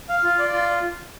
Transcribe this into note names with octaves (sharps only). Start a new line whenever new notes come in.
F5
F4
D5
F4